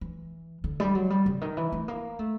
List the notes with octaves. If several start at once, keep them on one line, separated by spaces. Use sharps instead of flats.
E3
D3
G3
F#3
G3
C#3
D#3
E3
A3
A#3
A3